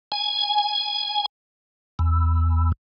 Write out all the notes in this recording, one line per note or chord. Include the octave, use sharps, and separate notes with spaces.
G#5
E2